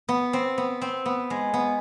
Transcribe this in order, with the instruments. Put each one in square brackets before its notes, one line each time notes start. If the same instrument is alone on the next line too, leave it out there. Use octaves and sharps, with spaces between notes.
[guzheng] B3
C4
B3
C4
B3
G#3
B3